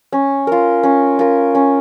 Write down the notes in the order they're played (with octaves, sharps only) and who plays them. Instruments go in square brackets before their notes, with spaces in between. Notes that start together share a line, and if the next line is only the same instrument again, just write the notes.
[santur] C#4
F4 A#4
C#4
F4 A#4
C#4